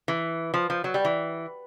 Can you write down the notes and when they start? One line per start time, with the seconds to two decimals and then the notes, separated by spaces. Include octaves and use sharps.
0.08 E3
0.54 F3
0.70 F3
0.84 F#3
0.94 G3
1.05 E3